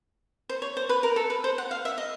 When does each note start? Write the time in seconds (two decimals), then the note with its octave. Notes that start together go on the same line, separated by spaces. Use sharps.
0.49 C5
0.62 C#5
0.77 C5
0.89 B4
1.03 A#4
1.16 A4
1.30 B4
1.44 C5
1.58 F#5
1.71 F5
1.85 E5
1.98 D#5